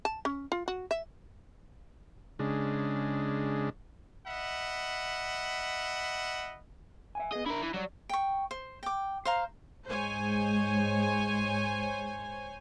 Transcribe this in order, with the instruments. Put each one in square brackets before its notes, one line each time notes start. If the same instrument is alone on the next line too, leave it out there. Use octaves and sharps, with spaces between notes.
[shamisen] A5
C#4
F4
F#4
E5
[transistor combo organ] C#3 G#3 D4
[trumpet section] D#5 E5 F#5 B5
[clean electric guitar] E5 F#5 G#5
[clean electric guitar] B3 G#4 [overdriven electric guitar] D#5
[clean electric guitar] D4 [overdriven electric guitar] E4 A#4
[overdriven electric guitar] E3
[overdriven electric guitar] F#3 [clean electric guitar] G3 D5
[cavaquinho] G5 C#6
C5
G5 D6
C5 F5 A#5
[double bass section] G#2 G#3 [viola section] C5 C#5 G#5